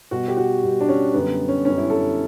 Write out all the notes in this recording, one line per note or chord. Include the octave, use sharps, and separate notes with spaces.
B2 G3 F#4
G4
F#4
B2 G3
D4
C#4
F#2 D3 G3 B3
C#4
F#2 D3 G3 C#4
E4
A4